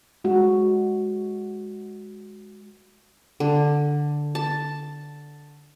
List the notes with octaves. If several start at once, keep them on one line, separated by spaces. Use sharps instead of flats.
G#3 F#4
D3
A5